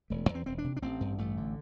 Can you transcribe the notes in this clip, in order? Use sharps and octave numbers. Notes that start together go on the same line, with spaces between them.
E1 A3
E2
C4
E1 C4
D4
C3
D4
A1 C4
G2
A1 A3
D3